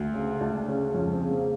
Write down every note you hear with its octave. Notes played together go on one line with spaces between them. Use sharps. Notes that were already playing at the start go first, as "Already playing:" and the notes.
Already playing: D2
C#3
D2 D4
C#3 C#4
F2 C#4
C4
C#3
A#3